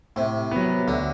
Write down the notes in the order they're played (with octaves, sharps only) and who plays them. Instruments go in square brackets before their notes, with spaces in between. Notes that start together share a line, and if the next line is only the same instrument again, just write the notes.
[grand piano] A2 [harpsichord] C3
[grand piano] F#3 B3
[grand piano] D2 [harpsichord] D3